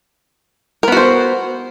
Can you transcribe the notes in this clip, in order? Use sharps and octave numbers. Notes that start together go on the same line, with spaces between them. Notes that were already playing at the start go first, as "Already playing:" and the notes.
B3 F#4 A#4 C5